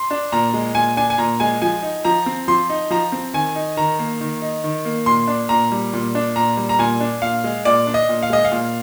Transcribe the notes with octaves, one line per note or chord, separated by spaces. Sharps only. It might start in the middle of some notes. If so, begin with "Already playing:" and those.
Already playing: C6
D4
A#2 A#5
G#3
A#2 G#5
D4 G#5
G#5
A#2 A#5
G#3 G#5
F3 G#5
D#4
F3 A#5
C4
F3 C6
D#4
F3 A#5
C4
D#3 G#5
D#4
D#3 A#5
A#3
D#3
D#4
D#3
A#3
A#2 C6
D4
A#2 A#5
G3
A#2
D4
A#2 A#5
G3
A#5
A#2 G#5
D4
A#2 F5
G#3
A#2 D5
D4
D#5
A#2
F5
G#3 D#5
F5
A#2